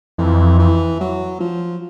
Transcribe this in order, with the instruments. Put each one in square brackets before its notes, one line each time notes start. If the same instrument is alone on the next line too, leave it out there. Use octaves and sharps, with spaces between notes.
[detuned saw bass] F2 [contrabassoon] E3
[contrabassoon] E3
F#3
F3